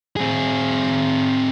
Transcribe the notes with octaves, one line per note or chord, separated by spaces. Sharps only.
C4 G#4